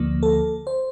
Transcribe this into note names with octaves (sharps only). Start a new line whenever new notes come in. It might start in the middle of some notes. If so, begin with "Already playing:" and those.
Already playing: D2 D3 F3 A#3
A4
C5